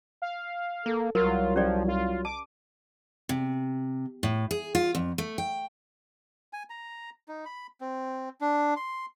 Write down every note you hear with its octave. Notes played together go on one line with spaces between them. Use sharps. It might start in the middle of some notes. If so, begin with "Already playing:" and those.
F5
A#3 A4
C2 F#3 F4 A#4
F3 C#4 G4 D5
F4
A5 D6
C3
A2
G#4
F4
F2
A3
G5
G#5
A#5
D#4
B5
C4
D4
C6